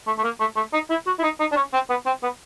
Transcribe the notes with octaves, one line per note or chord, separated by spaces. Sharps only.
A3
A3
A#3
A3
A3
D#4
E4
F#4
E4
D#4
D#4
D4
C#4
C4
B3
C4
B3